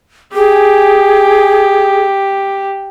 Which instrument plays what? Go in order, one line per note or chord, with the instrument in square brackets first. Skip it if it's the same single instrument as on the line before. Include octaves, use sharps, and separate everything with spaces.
[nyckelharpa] G4 [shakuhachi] G#4